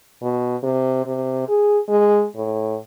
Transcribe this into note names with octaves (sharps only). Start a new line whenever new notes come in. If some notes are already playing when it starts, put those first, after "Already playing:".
B2
C3
C3
G#4
G#3
A2